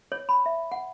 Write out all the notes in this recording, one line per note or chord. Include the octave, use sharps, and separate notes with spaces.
C#5
B5
E5
F#5